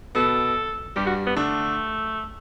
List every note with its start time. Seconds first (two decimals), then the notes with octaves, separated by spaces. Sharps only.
0.15 B2 B3 A4
0.96 G2 G3 G4
1.07 F#4
1.27 B3
1.36 D3 A3 D4